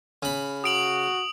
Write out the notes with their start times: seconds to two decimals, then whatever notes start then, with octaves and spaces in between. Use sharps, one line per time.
0.23 C#3 B5
0.64 F#4 D#6 D7 F#7